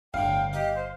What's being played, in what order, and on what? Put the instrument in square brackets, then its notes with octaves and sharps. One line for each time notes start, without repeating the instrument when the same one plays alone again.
[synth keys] G1 [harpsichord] A2 D3 [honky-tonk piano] F5 [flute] G5
[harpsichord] D#4 D#5 [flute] G4
[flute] C5